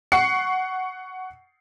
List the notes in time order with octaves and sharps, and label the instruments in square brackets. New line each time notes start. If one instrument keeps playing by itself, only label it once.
[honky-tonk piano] F#5 C#6 C7 C#7